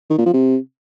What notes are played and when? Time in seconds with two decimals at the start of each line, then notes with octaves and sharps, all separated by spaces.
0.10 D#3
0.18 A#2
0.26 F3
0.34 C3